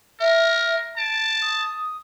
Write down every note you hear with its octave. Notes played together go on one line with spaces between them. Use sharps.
A#4 E5
A5 D7
D#6